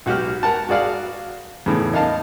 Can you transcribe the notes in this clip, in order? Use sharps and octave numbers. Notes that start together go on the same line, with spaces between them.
B1 F#4 G4 F6
A#4 F#5 A5
F#4 G#4 D5 F5 F#5
E2 A2 C#3
D#4 A#4 F5 A5